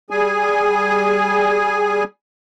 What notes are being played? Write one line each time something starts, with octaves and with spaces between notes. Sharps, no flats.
G3 G#4 G#5